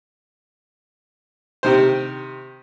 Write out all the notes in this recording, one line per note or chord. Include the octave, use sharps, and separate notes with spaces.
C3 D#3 C5